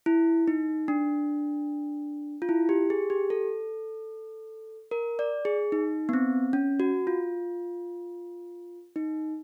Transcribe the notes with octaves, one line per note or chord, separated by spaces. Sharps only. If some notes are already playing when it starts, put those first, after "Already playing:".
E4
D#4
D4
F4
E4
G4
G#4
G4
A4
A#4
D5
G#4
D#4
B3
C4
C#4
F#4
F4
D#4